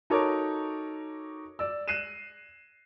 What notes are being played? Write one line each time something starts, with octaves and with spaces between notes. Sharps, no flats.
D#4 F#4 A4 A#4 C#5 D6
D5 E6
F#6 C7 D#7 E7